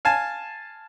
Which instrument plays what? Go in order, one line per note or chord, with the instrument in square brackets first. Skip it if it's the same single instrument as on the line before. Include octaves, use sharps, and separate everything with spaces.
[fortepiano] F5 G#5 A5